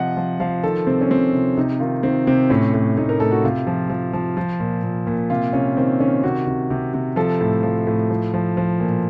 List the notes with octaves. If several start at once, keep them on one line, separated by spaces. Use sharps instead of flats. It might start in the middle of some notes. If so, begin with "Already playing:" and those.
Already playing: C3 F3 D#5 F#5
F3
F3 F5
D#3 A4
C3 C4
C#4
C3 C4
C3
C3 D#4
D#3 F4
D#3 C4
C3 C4
A2 C#4
A2
A2 D#4
A#4
A2 A4
F#4
C3 F4
F3
F3
F3
F3
A#2
A#2
A#2
C3 F4
C3 C#4
D#3 C4
D#3 C#4
C3 F#4
C3
C3
C3
F3 A4
A2
F3
A2
F3
F3
F3
A#2